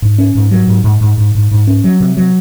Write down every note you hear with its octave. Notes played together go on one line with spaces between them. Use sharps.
G#2
C#4
G#2
F#3
G#2
G#2
G#2
G#2
G#2
G#2
C#4
F#3
C3
F#3